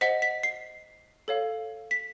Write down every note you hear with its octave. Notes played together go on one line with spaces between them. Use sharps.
C5 D#5 F#5 B6
B6
C7
A4 C#5 F5
B6